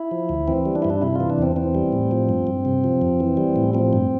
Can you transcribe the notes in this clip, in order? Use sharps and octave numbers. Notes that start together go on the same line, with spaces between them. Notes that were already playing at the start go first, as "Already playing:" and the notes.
Already playing: E4
F3
D2
E3 C4
G3
D4
G2 E4
D4
C3 E4
E3 F4
D4
E2 C4
E3 C4
G3
A2
F3
G2
G2
C3
F3
F2
E3
G3
A2
F3 C4
G2